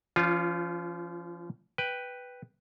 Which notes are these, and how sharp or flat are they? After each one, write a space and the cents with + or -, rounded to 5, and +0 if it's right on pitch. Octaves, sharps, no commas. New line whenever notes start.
F3 -35 C#4 +30 F4 +0
B4 +0 G5 +0